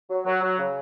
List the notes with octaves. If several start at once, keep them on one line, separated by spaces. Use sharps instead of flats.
F#3
F#3
F#3
C#3